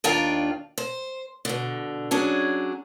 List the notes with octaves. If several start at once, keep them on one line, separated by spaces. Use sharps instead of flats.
D#2 D#3 D4 F4 F5 G5
C5
B2 D3
F#3 C#4 D4 G#4